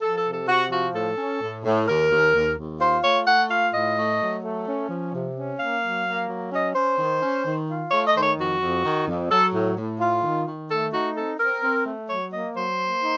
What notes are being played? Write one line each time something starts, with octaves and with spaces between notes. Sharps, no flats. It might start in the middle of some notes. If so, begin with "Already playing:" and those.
F3 A4
A4
C3
A4
C3 F#4
F3 F#4
A2 A4
C#4
A2
A2
D#2 A#4
D#2
D#2
D#2
F4 C5
A3 C#5
A3 F#5
F4 F5
A2 D#5
A3
F#3
A3
C#4
F3
C3
C#4
A#3 F5
F#3
A#3
F#3
C#4 D#5
C#4 C5
D#3
C#4
D#3
F4
A3 C#5
D#5
D#3 C5
C#5
F2 F#4
F2
D#3
F2
F#3 A4
A2
A2
F4
D#3
D#3
A3 A4
D#4 F#4
C4 A4
C4 A#4
C4
A3
F#3 C#5
A#3 D#5
F#3 C5
A#3
D#4